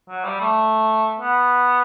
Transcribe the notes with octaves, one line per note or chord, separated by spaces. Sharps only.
F#3
G3
A3
B3